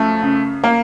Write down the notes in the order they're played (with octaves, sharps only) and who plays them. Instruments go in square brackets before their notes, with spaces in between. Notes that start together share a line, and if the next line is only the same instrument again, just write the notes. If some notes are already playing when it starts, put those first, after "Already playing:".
Already playing: [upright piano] F#2 F3 A3
C#3
A#3